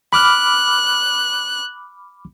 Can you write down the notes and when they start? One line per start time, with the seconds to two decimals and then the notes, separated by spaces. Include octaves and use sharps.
0.13 B5 D6 F6 F#6